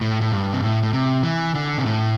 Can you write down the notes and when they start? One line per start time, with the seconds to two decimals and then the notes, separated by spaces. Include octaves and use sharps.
0.01 A2
0.21 A2
0.32 G2
0.52 C3
0.63 A2
0.83 A2
0.93 C3
1.23 E3
1.55 D3
1.78 C3
1.86 A2